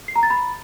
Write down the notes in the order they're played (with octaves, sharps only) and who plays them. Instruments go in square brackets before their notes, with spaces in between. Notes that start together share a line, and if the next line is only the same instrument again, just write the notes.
[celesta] C7
A#5
A6
B5